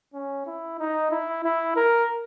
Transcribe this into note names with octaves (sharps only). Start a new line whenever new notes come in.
C#4
E4
D#4
E4
E4
A#4